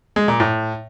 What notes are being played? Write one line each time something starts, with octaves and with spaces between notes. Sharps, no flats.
G#3
A#2
A2